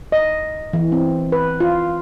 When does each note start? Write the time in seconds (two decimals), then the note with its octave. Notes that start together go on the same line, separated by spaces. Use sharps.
0.12 D#5
0.73 E3
0.92 C4
1.32 B4
1.60 F4